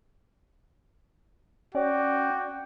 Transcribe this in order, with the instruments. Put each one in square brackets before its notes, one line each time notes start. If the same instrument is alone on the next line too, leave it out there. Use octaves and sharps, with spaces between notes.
[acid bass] C#4 [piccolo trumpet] F#4 [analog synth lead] D5 [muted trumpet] G5